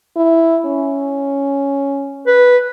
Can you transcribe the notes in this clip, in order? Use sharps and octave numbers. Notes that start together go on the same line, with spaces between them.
E4
C#4
B4